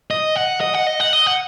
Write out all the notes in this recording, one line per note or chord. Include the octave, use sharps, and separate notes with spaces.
D#5
F#5
D#5
F#5
D#5
F#5
D#5
F#5